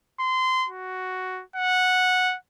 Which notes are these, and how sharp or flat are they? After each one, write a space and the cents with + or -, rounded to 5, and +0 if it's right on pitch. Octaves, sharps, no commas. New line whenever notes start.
C6 -20
F#4 +5
F#5 -10